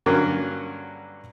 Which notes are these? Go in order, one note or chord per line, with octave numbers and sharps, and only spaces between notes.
G2 D3 F#3 A#3 C#4